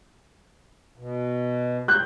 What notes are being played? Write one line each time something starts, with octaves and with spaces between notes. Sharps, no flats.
B2
F#6 G6